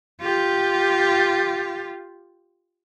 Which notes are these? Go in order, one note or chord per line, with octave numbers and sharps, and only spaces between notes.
F4 G4